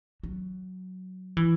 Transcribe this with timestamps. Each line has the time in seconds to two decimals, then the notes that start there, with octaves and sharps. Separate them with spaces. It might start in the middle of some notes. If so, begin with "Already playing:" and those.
0.23 F#3
1.37 E3